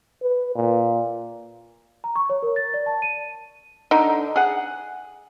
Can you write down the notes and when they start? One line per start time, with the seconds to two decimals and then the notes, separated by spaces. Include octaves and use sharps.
0.22 B4
0.55 A#2
2.04 A#5
2.16 C#6
2.30 C#5
2.43 A#4
2.56 A6
2.74 D5
2.86 A5
3.02 D#7
3.91 D3 D#4
4.36 G#4 F#5